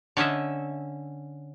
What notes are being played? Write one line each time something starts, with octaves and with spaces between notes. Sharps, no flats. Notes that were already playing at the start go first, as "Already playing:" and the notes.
D3 C#4 D#5 E5